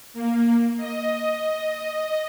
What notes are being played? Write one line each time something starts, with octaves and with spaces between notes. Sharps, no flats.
A#3
D#5